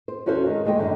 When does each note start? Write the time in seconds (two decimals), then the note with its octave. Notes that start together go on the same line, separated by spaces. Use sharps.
0.08 C5
0.26 E2 C#4 F#4 A4 C5 F5
0.46 D#3 G#3
0.65 D#2 G#3 A3 D#5 G5
0.78 F#2 D3 D#3